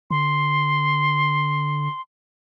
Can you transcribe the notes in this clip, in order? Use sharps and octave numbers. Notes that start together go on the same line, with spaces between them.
D3 C6